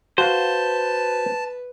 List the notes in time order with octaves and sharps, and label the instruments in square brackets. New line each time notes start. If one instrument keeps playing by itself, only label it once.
[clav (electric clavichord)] F#4 F5 [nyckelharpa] B4 [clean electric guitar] C5 [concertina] A5